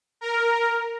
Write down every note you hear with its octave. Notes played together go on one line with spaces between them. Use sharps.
A#4